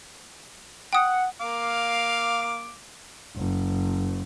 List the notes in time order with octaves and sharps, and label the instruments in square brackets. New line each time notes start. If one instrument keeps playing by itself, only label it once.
[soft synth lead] F#5 [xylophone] G5 D#6
[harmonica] A#3 F5 D6
[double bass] F#1